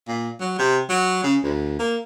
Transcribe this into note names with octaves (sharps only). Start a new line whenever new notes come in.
A#2
F#3
C3
F#3
C#3
D2
A#3